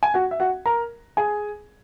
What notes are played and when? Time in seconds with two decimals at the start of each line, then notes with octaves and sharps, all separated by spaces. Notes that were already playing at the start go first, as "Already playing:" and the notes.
0.03 G#5
0.14 F#4 F#5
0.31 E5
0.40 F#4 F#5
0.66 A#4 A#5
1.17 G#4 G#5